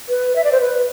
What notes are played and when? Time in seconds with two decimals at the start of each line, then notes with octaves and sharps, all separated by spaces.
0.09 B4
0.36 E5
0.44 D5
0.52 C5
0.61 B4